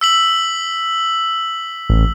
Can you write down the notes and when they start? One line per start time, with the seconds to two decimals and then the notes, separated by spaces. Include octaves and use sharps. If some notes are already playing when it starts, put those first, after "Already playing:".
0.01 E6 B6 F#7
1.90 A1